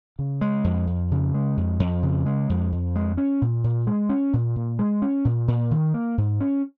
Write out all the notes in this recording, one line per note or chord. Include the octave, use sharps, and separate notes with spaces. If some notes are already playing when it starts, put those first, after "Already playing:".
C#3
G#3
F2
F2
C#3
G#3
F2
F2
C#3
G#3
F2
F2
G#3
C#4
A#2
A#2
G#3
C#4
A#2
A#2
G#3
C#4
A#2
A#2
D#3
A#3
G#2
C#4